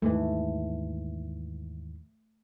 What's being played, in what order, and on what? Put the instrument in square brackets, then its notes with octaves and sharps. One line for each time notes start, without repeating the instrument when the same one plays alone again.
[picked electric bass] D#2 G#2 E3 [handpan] A3